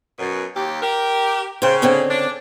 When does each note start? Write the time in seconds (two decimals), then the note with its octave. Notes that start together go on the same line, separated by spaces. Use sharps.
0.19 F#2 B2
0.55 D#2 G4
0.82 G4 A#4
1.62 C#3 C5 G5
1.82 D3 C4 C#4
2.09 D4